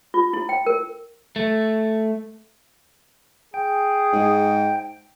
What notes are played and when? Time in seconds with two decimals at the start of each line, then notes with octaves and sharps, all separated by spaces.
0.14 F4
0.33 E4
0.49 G5
0.66 A#4
1.36 A3
3.54 G#4 G5
4.13 G#2